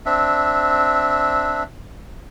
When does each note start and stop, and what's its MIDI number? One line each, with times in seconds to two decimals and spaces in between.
0.06 1.63 60
0.06 1.63 62
0.06 1.63 76